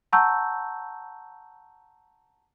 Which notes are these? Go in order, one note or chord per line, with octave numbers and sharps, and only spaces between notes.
F#5 A5 A#5 C#6 E6 G6